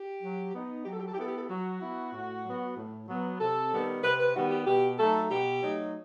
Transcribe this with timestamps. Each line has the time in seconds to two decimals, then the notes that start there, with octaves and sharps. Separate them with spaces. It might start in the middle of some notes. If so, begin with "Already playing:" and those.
Already playing: G4
0.22 F#3
0.54 B3 D#4
0.85 F#3 G4
0.92 A4
0.99 G4
1.07 A4
1.14 G4
1.17 B3 E4 A4
1.27 G4
1.35 A4
1.42 G4
1.49 F#3 F#4
1.82 B3 E4
2.13 A2
2.45 F#3 B3
2.77 A2
3.08 F#3 B3
3.41 C3 A4
3.72 D#3 G3 B3
4.03 C3 B4
4.20 B4
4.35 D#3 G3 B3 F#4
4.51 G4
4.67 B2 G4
4.98 F#3 A3 D#4 A4
5.30 B2 G4
5.63 F#3 A3 D#4